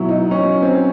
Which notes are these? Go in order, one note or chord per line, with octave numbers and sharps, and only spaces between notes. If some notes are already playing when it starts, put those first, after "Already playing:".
Already playing: B2 F#3 E4
D#4
C#4
C4